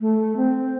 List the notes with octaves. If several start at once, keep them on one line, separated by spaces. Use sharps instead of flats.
A3
C4